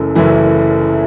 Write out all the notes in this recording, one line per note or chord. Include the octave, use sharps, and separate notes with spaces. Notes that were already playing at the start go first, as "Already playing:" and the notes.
Already playing: F#1 F#2 E3 A3 E4
F#1 F#2 E3 A3 E4